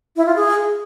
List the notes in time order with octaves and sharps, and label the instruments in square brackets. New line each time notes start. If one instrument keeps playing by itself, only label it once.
[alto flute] E4
F4
G#4